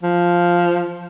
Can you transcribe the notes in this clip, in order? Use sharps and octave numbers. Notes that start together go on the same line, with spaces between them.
F3